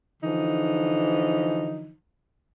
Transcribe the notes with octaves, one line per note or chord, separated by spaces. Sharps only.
D3 E3 F3 D#4